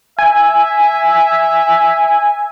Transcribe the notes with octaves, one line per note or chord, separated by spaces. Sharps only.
E5 G#5